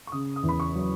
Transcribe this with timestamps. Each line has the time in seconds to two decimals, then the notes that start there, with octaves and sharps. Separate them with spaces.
0.07 C#6
0.12 C#3 D#6
0.36 D#6
0.43 E2
0.49 B5
0.60 C#6
0.75 F#3